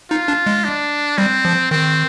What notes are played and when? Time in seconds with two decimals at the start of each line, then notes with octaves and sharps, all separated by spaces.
0.10 D#4 F4
0.28 D4
0.46 G#3
0.64 D4
1.18 G3 C4
1.45 F3
1.71 D#3 C4